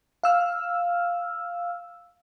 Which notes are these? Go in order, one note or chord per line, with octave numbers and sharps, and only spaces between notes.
F5 E6 F6